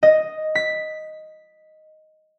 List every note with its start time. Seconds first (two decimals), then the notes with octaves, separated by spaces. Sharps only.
0.03 D#5
0.55 B6